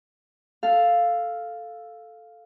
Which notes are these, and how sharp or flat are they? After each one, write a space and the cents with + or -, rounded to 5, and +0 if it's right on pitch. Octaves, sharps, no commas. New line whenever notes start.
A4 +0 F5 +0